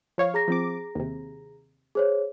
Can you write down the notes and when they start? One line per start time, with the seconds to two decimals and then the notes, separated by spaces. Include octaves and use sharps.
0.18 F3 C#5 F5
0.34 G#4 A#5 A#6
0.48 F3 C4 D6
0.95 D#2 C3
1.95 G#4 C5 C#5